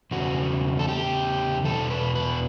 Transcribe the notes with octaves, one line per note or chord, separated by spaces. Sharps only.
E2 C#3 F#4
A4
G4
E2 B2 A4
B4
B4